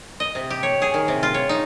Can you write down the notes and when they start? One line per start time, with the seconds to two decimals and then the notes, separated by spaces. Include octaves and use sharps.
0.20 D#5
0.35 C3
0.50 G4
0.63 C#5
0.82 G#4
0.94 D#3
1.08 C3
1.23 F4
1.34 C#5
1.49 D#4